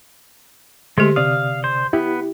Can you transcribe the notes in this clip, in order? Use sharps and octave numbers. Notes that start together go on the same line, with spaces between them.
D3 G#3 A3 G4
C3 D5 F5 D#6
C5
B3 E4 G4